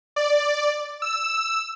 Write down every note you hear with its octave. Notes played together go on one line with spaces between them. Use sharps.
D5
E6